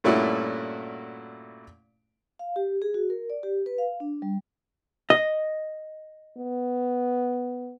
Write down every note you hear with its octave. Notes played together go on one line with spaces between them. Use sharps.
G2 A#2 A3 C#4 E4 F#4
F5
G4
G#4
F#4
A#4
D5
G4
B4
F5
D4
G3
D#5
B3